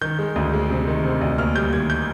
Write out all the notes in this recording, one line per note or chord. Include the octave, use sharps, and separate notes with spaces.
D#3 G6
G#3
D2
G#3
C3
D#3
C3
D2
D#2 F6
G3 G6
D#3 G#6
G6